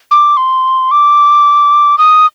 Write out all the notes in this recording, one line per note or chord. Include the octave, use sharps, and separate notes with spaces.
D6
C6
D6
D#6